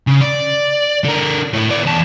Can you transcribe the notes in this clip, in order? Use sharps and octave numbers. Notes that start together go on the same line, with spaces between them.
C#3
D5
D3 A#4
A2 A3
B3 D5
E2 A5